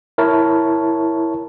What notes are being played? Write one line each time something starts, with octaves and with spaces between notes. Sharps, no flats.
E4 A#4 C#5 A5